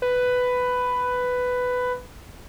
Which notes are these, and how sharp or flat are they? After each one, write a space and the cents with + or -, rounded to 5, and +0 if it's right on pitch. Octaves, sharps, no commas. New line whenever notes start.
B4 +10